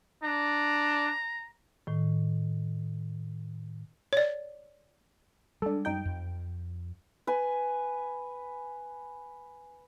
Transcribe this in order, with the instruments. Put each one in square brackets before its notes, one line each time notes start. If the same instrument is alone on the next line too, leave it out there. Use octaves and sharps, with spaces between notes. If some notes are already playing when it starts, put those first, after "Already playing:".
[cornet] D4 [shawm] A#5
[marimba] A2 D#3
[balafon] C#5 D5
[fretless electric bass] G3 G#3 [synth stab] D4 A4
[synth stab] F#2 D#4 G5
[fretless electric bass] F2
[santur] B4 G#5